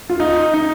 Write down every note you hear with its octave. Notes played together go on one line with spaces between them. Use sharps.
F4
D#4
D#4